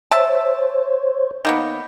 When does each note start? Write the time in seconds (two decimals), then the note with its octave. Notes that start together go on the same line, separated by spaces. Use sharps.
0.11 C5 C#5 E5 A5
1.45 D#3 A#3 B3